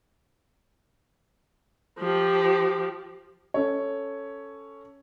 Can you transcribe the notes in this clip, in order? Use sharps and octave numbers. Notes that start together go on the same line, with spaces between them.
F3 G4
C#4 A4 C#5